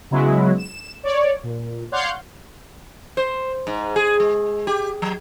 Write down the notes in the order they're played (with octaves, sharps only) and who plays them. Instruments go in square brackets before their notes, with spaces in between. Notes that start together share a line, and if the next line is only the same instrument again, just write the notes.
[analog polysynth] C#3 F#3 G#3 B3 E4 F#4
E7
C#5 D5
A#2
C#5 D5 F5 F#5 C6 G6
[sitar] C5
G#2
G#4
G#3
G4
F#3